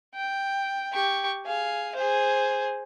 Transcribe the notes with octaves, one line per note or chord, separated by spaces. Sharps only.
G5
G4 C#6
G#4 F5
G#4 C5